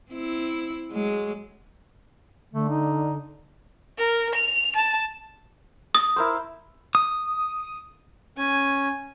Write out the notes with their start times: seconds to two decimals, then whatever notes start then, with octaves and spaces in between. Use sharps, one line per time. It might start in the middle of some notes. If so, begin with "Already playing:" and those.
0.11 C4 E4
0.92 F#3 G#3
2.53 D3 A3
2.69 D#4
3.98 A#4
4.35 F7
4.76 A5
5.95 D#6
6.16 E4 A#4 C5
6.95 D#6
8.38 C#4 G#5